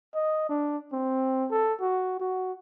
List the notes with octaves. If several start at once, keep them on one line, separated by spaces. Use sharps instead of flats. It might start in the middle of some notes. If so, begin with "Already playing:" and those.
D#5
D4
C4
A4
F#4
F#4